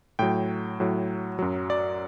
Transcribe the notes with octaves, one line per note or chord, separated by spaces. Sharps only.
A2 F#3 G5
A2 F#3
F#2 F#3
D5